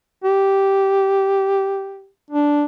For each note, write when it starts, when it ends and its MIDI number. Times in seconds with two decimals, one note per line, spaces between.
0.24 2.09 67
2.30 2.65 62